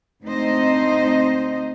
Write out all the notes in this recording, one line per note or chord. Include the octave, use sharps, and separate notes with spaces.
D2 C4 D#4 C5 D#5